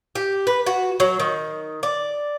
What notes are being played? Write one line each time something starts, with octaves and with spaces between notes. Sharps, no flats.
G4
B4
F#4
F#3
D#3
D5